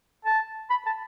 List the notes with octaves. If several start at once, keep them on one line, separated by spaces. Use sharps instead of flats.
A5
B5
A5